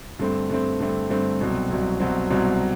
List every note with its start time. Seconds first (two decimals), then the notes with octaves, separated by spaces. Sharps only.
0.19 G2 D3 A3 C4
0.50 G2 D3 A3 C4
0.80 G2 D3 A3 C4
1.10 G2 D3 A3 C4
1.40 C2 B2 F#3 C4
1.71 C2 B2 F#3 C4
2.00 C2 B2 F#3 C4
2.30 C2 B2 F#3 C4